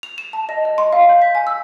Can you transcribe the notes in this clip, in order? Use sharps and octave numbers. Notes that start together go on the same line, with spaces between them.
F7
E7
A5
D#5
D#5
C6
F5
G6
B6
G#5
E6